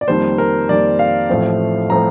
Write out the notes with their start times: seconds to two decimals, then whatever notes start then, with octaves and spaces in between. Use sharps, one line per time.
0.01 D5
0.08 F2 D#3 G3 A#3 C5
0.38 A#4
0.69 F2 D#3 G3 A#3 D5
0.99 F5
1.29 A1 A2 F3 A3 C4
1.90 A2 F3 A3 C4 A#5